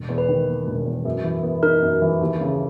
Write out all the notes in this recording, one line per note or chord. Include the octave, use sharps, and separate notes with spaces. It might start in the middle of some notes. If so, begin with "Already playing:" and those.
Already playing: E1
E2
B4
D#3
A#3
E1
E2
F#2
E3
B3
D#4 A#4
F#2
E3
D#2
C#3